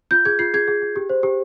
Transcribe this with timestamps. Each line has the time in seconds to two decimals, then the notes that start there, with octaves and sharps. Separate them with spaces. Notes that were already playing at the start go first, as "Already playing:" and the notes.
0.11 F4 G6
0.25 G#4 G#6
0.39 F4 C7
0.54 G#4 G#6
0.68 G#4
0.82 G#4
0.96 G4
1.09 C5
1.23 G4